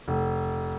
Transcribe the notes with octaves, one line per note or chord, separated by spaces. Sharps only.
F1